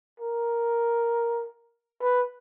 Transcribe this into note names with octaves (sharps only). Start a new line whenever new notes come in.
A#4
B4